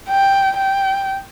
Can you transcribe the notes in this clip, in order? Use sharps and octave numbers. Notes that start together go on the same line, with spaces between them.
G5
G5